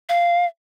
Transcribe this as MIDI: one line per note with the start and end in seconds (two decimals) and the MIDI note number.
0.09 0.46 77